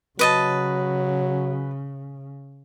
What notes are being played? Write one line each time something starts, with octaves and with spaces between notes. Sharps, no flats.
C#3 F#3 B4 D#5 A5